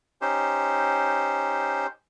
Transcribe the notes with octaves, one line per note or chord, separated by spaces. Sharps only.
C#4 D#4 G4 C5